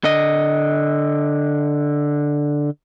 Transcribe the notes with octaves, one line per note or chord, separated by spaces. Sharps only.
D3 D#5